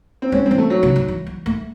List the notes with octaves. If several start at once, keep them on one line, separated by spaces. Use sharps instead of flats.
C4
G#3 C#4
C4
E3
A3
F#3
C#3
D#3
E3
F#3
A3